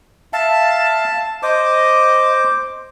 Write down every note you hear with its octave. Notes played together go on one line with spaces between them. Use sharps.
E5 F5 A5
C5 D#5 D6